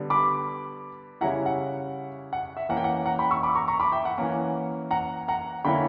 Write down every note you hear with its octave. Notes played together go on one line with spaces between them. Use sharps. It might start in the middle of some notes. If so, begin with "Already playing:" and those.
Already playing: D3 G3 B3
B5 D6
C#3 G3 C#4 E4 F#5 A#5
F#5
F#5
E5
E3 A#3 C#4 F#5
G5
F#5
F#5 A#5
G5 B5
C#6 E6
B5 D6
A#5 C#6
A#5 C#6
B5 D6
E5 G5
F#5
E3 A#3 C#4
F#5 A#5
F#5 A#5
D3 A#3 C#4 E4 G5 B5